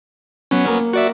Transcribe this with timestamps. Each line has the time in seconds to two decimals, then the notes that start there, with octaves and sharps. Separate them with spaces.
0.51 F#3 B3 C#4
0.68 A#3
0.93 F#4 D5 E5